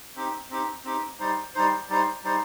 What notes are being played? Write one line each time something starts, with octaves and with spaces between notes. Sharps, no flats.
C4 D#4 G4
C4 D#4 G4
C4 D#4 G4
G3 D#4 C5
G3 D#4 C5
G3 D#4 C5
G3 D#4 C5